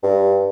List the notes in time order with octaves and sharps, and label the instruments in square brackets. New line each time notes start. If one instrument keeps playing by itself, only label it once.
[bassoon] G2